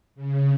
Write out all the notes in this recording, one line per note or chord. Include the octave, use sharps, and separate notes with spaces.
C#3